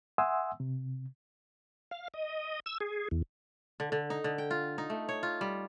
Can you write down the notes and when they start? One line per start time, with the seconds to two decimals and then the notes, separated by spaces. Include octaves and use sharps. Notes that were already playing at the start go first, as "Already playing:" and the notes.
0.18 E5 F#5 G#5 C6 D#6 E6
0.60 C3
1.91 F5
2.14 D#5
2.66 E6
2.80 G#4
3.11 E2
3.80 D3
3.92 D3
4.10 D#4
4.24 D3
4.38 G5
4.51 F4
4.78 D#4
4.90 A3
5.09 C#5
5.23 F4
5.41 G3